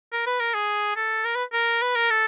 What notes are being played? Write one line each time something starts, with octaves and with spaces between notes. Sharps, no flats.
A#4
B4
A#4
G#4
A4
A#4
B4
A#4
B4
A#4
A4